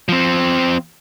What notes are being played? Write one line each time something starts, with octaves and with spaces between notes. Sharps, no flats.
F3 C4